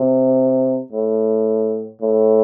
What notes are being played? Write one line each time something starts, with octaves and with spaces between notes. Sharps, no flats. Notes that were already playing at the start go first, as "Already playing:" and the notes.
Already playing: C3
A2
A2